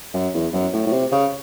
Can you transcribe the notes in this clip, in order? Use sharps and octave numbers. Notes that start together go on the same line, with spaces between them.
F#2
E2
F#2
A2
A2
C3
C#3